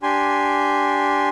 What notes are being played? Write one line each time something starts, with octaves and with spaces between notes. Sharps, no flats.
D4 G4 G#5 C6